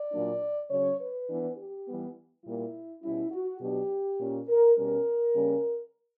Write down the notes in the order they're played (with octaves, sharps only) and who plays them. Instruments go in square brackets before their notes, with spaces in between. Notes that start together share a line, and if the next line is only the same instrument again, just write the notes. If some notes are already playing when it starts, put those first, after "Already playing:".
Already playing: [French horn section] D5
A#2 F#3 A#3 D4
C#3 F#3 C#4 C#5
B4
E3 B3 D4
G4
E3 G3 B3
A#2 G3 A#3 E4
B2 G3 C#4 E4
F#4
B2 F#3 B3 D4 G4
A#2 A#3 C#4
A#4
B2 G3 C#4 A#4
C#3 G3 A#3 C#4